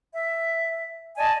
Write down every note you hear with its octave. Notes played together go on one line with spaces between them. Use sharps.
E5
D5 D#5 G#5 A5